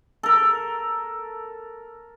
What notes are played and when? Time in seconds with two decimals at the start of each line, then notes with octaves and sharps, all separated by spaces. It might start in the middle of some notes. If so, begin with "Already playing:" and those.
0.23 A4 A#4